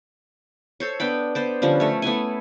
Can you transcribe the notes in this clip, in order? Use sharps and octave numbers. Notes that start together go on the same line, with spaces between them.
A4 C5 C#5
B3 D4 G5 B5
B3 C5 D5
D3 F3 G3 C#4
A3 C#5
A3 B3 E4 G#5